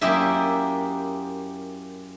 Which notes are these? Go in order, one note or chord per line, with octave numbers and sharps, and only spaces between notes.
F#2 A#3 E4 G4 D#5 E5